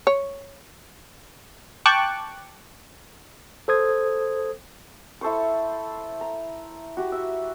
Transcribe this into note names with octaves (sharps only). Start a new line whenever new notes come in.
C#5
G5 A5 C#6 D6 F#6
A4 C5 D#6 G#6
E4 A4 C5 C#6
A#5
F#4 G4
E5